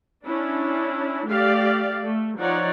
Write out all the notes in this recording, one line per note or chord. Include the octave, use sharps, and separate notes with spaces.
C#4 D4 E4
A3 G4 D5 F5
A3
F3 D#4 C#5 D5 F#5